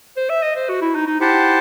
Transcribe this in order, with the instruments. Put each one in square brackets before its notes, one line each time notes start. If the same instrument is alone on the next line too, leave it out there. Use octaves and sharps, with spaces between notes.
[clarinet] C5
E5
D#5
C5
F#4
E4
D#4
D#4
[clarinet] E4 [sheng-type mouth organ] G4 C5 F#5 A5